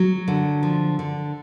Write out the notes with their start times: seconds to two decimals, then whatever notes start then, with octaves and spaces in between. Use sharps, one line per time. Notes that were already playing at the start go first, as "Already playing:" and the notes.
Already playing: F#3
0.28 D3
0.63 F3
0.99 D3